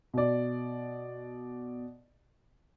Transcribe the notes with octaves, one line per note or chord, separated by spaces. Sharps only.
B2 D5